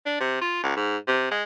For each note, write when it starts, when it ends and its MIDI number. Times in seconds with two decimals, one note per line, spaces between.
0.06 0.16 62
0.20 0.40 48
0.41 0.62 65
0.63 0.75 37
0.76 0.97 44
1.08 1.29 48
1.31 1.43 56